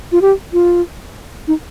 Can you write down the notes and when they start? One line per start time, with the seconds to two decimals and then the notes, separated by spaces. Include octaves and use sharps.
0.12 F4
0.22 G4
0.53 F4
1.48 D#4